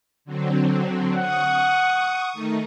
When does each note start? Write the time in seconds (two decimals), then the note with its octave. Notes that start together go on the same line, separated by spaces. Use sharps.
0.25 D3 F#3 C4
1.17 F#5 C#6 D#6
2.33 D#3 A3 D#4